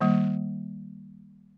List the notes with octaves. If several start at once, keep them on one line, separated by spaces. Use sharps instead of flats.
D#3 G3 A#3